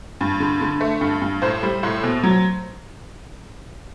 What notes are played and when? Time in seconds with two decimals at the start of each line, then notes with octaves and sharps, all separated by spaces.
0.21 G2
0.40 D3
0.61 D3
0.81 A3
1.01 G2
1.22 G2
1.42 A2 C5
1.63 G3
1.83 A2
2.03 B2
2.23 F#3